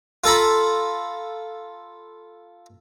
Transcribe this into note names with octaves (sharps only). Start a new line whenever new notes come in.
F4 A4 A#5 B5